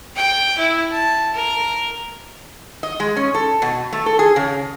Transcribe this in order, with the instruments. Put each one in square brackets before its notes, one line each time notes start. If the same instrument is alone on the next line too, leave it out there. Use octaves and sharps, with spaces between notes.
[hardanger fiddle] G5
E4
A5
A#4
[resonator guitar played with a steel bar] D#5
G#3
C#4
A4
B2
A3
A4
G#4
C#3